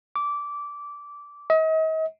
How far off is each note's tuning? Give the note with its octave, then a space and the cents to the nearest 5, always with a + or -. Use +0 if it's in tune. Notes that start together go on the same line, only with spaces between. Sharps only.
D6 -15
D#5 +40